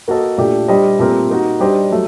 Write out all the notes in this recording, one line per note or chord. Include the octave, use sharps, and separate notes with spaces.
A#3 F#4 A4 D#5
A#2 A3 D4 G4
G3 D4 G4 C5 D#5
A#2 A3 C4 G4 A#4
A#3 D#4 F#4
G3 D4 G4 C5 D#5
F#3 A3